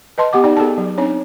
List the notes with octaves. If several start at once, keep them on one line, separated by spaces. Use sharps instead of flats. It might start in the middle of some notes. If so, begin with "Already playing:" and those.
B4 D#5 A5 C6
B3 G4 F#5 D6
D#4 D5 G5
B3 G#4 A4 A5
F#3
C4 D4 D#4 C#5